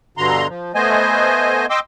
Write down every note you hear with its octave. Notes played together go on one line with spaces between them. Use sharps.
G2 B2 D3 A#5 C6
F3
A3 B3 C5 D#5 G#5
D#5 G5 C6 D6 E6